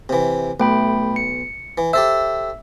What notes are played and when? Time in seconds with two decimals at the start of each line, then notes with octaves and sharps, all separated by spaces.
0.09 C3 E3
0.60 B1 A3 G5 B5
1.16 C#7
1.78 E3
1.93 G4 A4 C5 E5 E6